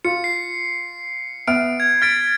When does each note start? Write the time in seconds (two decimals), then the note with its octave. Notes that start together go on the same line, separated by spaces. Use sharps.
0.05 F4 C#7
0.24 C7
1.47 B3 E5 F6 D7
1.80 G#6
2.02 F6 A6 B6 D7